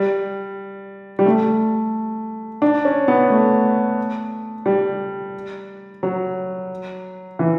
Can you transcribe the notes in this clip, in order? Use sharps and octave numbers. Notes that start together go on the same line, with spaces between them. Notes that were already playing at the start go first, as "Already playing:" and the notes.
Already playing: G3
G3
A3
D4
C#4
B3
A3
G3
F#3
E3